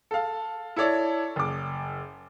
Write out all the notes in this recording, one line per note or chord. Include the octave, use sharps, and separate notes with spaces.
A4 F5
E4 A4 C#5 D5
F#1 D6